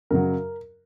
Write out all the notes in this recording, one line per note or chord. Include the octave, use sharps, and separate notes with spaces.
F#2 C#3 F#3 A#4